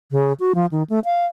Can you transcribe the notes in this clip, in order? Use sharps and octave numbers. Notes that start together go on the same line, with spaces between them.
C#3
F#4
F3
D#3
A3
F5